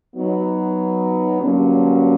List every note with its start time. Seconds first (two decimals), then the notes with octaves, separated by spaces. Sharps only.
0.15 F#3 B3 D#4
1.41 G2 D3 F#3 A#3 C#4